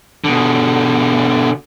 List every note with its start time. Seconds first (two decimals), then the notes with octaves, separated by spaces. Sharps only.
0.24 B2 D3